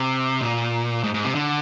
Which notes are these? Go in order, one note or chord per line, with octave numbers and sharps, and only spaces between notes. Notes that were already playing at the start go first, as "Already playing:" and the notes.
Already playing: C3
A#2
G#2
G#2
C3
D3